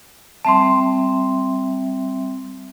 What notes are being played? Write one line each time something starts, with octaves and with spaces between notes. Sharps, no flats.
G3 C4 E5 A5 C6